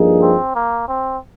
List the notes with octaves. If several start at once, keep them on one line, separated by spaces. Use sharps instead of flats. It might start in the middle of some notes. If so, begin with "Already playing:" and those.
Already playing: G2 F3 A#3 D#4 G#4
C4
A#3
C4